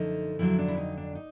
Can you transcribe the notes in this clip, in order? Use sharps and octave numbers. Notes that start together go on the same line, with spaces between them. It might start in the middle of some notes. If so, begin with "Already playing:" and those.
Already playing: F#2 D3 F3 A3 D#4
F2 D3 F#3 E4
D4
E4
D#4
D4
D#4